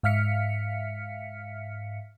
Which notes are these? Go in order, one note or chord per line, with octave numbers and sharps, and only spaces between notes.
G#2 E5 F5 F6 B6 C#7